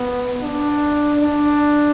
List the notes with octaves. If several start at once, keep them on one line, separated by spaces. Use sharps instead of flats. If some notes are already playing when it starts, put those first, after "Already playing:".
Already playing: B3
D4
D4